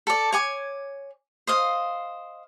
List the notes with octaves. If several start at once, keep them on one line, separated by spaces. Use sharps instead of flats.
A4 D5
C#5 G#5 D6
C5 D#5 F5